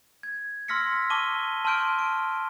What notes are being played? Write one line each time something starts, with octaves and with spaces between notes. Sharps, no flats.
G#6
C6 E6 F6 A#6 B6 C#7
A5 C#6 D6 D#7 G7
A5 C6 D6 F6 G6 D7
D7